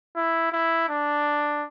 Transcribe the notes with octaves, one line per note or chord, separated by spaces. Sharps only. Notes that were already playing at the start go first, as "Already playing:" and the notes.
E4
E4
D4